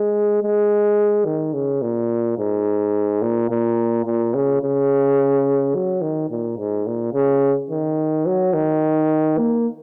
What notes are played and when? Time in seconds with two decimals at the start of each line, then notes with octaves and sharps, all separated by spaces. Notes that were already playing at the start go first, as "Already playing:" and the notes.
Already playing: G#3
0.42 G#3
1.25 D#3
1.54 C#3
1.82 A#2
2.38 G#2
3.22 A#2
3.50 A#2
4.05 A#2
4.34 C#3
4.62 C#3
5.74 F#3
6.01 D#3
6.30 A#2
6.57 G#2
6.86 A#2
7.13 C#3
7.71 D#3
8.26 F#3
8.53 D#3
9.38 A#3